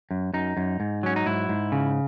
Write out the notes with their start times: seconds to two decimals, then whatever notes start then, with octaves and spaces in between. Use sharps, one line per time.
0.11 F#2
0.34 F#2 D#4
0.57 F#2
0.80 G#2
1.03 F#3 C#4
1.16 D#4
1.26 G#2 E4
1.49 G#2
1.72 C#3